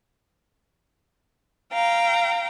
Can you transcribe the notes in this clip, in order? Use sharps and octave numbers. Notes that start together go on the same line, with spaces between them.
F5 G5 A#5